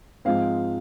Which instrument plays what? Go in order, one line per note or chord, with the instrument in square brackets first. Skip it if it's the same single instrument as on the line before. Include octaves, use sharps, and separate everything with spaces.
[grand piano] G#2 F3 G#3 C4 F5